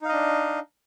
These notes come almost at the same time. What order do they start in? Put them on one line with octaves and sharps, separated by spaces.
D#4 F5 D#5 D4